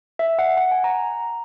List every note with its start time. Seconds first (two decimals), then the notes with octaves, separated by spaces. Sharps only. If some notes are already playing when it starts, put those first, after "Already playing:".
0.19 E5
0.39 F#5
0.57 F#5
0.72 G#5
0.84 A#5